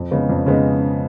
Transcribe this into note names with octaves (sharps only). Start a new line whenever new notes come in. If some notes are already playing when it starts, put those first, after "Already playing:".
Already playing: F2
C#3 G#3 B3 D#4
F2
C#3 G#3 B3 D#4